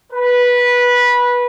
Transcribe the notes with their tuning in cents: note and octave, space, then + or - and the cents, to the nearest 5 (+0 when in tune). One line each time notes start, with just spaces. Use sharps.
B4 -15